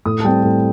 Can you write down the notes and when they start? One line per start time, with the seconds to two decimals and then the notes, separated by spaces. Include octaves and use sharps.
0.06 A2 D#6
0.20 A5
0.24 G3 C4 G5
0.44 A2